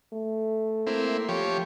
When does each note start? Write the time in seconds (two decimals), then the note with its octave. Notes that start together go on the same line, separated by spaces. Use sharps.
0.13 A3
0.87 A#3 C4 E4
1.29 F3 G4 C#5